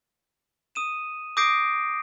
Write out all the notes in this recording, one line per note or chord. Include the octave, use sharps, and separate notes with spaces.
D#6 D#7 E7
D6 D#6 G6 A#6 C7 D7